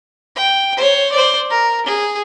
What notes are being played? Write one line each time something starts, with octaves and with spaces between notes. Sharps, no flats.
G5
C5 C#5
C5 D5
A#4
G#4